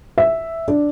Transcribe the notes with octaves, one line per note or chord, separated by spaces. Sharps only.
E5
D4